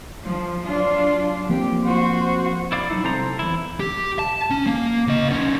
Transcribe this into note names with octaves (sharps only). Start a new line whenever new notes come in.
F3
F#3 D4 F4
F3 A#3 C4 G4
F#4 C5
E4 D5 F5
F#3 D#4 E4
C2 C4 A4 C5 A#5
E2 E4
G4
A5
C#4
A#3
C#3 D#5
B3 C#4